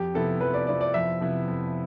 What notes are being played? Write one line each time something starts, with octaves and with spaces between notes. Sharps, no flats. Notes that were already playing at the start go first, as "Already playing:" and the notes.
Already playing: F2 G4
C3 F3 B3 E4 A4
F2 B4
D5
C3 F3 B3 E4 D5
D5
F2 E5
C3 F3 B3 E4
F2